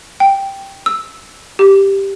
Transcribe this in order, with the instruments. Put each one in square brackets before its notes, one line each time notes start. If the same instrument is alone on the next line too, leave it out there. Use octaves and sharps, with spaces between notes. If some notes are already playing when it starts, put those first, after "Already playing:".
[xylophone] G5
E6
G4